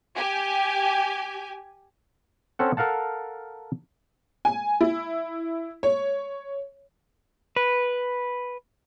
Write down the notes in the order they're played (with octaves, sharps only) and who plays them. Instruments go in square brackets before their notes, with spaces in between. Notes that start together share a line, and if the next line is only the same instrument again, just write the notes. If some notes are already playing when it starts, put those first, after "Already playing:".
[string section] G4 G#5
[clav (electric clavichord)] C4 C#4 A4 F#5
A4 A#4 F5 F#5 A5
[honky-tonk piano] G#5
E4
C#5
[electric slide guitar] B4